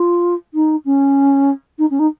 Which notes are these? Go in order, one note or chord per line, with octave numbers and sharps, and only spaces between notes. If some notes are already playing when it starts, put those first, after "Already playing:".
Already playing: F4
D#4
C#4
D#4
C#4
D#4